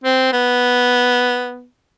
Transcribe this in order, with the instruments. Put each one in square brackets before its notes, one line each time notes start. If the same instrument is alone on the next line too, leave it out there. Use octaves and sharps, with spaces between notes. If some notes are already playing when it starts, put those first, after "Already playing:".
[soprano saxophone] C4
B3